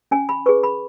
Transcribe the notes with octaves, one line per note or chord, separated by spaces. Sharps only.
C#4 G#5
B5
G#4 B4 C#6
B5